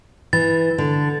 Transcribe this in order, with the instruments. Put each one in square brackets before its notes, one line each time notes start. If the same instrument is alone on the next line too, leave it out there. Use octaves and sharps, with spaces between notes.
[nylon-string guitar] E3 [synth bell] A6
[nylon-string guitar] D3